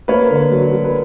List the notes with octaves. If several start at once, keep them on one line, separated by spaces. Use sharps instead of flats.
A#3 B4 C#5
D3
F#3
F#3
B4